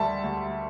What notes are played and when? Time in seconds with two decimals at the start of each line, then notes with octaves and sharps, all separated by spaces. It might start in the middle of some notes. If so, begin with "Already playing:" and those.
Already playing: D2 G3 E5 A5
0.24 D2